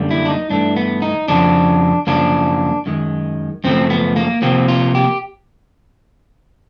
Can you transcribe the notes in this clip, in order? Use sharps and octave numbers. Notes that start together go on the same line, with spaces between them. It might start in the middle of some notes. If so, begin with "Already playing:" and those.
Already playing: F#2 D3 G3 A#3
E4
D4
D#4
G2 E3 A3 D4
B3
D#4
F2 C#3 F3 D4
F#2 C#3 F3 A#3 D4
F#2 D#3 G#3
F#2 C#3 F3 A3 C4
B3
A#3
C3 F3 A#3 C4
F4
G4